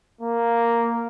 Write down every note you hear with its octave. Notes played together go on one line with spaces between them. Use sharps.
A#3